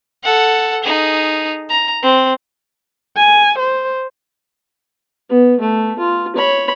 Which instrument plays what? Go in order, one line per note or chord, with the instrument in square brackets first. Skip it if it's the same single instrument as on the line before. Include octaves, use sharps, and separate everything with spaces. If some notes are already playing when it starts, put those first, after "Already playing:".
[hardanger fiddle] A4 F#5
D#4 G#4
A#5
C4
[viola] G#5
C5
[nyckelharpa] B3
A3
F4
C#5 B5